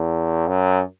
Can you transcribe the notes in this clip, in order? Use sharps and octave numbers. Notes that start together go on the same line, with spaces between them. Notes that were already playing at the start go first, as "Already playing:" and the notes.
Already playing: E2
F#2